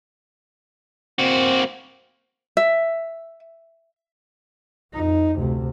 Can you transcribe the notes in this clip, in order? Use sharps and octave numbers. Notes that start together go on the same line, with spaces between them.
A#3 C4 F#4
E5
F2 D#4
D2 C3